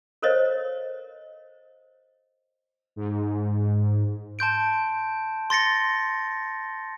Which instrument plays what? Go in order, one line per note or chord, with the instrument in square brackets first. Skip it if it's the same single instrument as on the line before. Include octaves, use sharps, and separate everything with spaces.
[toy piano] A4 A#4 C5 C#5 D#5 F5
[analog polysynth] G#2
[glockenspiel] A5 C6 G6 D7
C6 A6 A#6 C#7